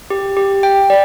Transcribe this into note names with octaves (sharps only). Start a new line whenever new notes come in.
G4
G4
G5
D5